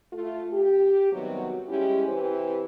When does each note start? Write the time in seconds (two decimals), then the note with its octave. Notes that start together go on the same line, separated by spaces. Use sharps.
0.13 A3 F4
0.52 G4
1.12 C3 D#3 F#3 G3 B3 F#4
1.69 G3 G#3 C#4 E4 G4
2.08 C3 E3 G4 B4 C5